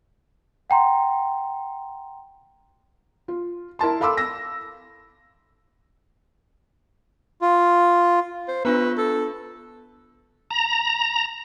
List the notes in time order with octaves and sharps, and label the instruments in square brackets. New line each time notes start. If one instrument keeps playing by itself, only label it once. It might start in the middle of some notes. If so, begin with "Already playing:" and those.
[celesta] F#5 G5 A#5 C6
[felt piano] F4
E4 A#4 A5 C6
A4 F5 B5 C6 D6 E6
E6 A#6
[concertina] F4
[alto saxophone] C5
[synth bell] B3 D4 F4 [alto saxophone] B4
[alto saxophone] A4
[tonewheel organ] A#5